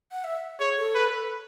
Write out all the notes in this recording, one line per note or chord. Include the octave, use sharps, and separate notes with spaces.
F#5
E5
G#4 C#5
A4
B4